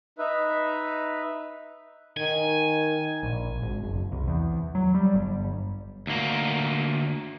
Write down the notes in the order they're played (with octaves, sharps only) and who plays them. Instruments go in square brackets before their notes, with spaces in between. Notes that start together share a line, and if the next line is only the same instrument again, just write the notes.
[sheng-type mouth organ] D#4 B4 E5
[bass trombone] D#3 [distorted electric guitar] G#5
[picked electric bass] A#1
G#1
F#1
C2
E2
F#3
G3
G1
[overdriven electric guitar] D2 A#3